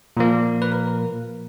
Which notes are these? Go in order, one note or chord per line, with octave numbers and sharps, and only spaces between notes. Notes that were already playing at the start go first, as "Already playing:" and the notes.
A#2 F3 A#3
B4
A#4